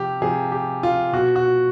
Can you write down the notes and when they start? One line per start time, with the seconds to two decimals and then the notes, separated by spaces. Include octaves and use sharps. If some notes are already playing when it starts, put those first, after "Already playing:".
Already playing: C3 F3 G4
0.22 C3 F3 G#4
0.52 G4
0.83 F4
1.13 B2 F#4
1.36 F#4